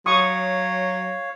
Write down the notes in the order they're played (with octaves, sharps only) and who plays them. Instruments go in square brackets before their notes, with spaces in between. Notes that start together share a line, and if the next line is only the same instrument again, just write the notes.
[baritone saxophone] F#3 [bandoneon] C#5 F5 [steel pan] C#6 D#6